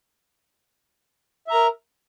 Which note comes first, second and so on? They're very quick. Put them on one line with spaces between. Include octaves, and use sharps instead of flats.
E5 A#5 A#4